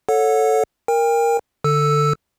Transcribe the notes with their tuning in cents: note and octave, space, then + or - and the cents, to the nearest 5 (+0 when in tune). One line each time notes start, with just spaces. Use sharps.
A4 +0 C#5 +0 F#5 -25
A#4 +0 G5 +40
D3 +0 A4 +15 E6 +0